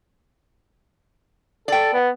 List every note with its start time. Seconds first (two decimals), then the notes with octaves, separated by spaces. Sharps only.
1.68 A4 D5 G5
1.93 B3